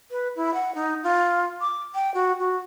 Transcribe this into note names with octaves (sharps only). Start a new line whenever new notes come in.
B4
E4
F#5
D#4
F4
D6
G5
F#4
F#4